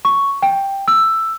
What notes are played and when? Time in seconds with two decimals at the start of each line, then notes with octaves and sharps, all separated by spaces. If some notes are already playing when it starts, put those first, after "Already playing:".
0.05 C#6
0.43 G5
0.88 E6